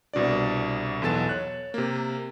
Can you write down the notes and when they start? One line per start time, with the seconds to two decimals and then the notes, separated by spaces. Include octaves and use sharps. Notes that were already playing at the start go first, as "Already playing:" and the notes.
0.13 C2 B2 D4 D5
1.02 B1 E2 B3 A4 A6 E7
1.29 C#5 F#6
1.74 C3 A#3